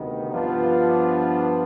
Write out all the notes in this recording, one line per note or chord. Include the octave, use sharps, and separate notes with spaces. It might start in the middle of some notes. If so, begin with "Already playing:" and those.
Already playing: D2 C3 D#3 B3 D#4
G2 F3 B3 D4 F4